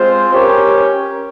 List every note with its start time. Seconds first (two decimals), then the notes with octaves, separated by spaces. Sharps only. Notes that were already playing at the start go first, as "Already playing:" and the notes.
Already playing: G#3 C4 F4 C5
0.33 C#4 G4 A#4 C#5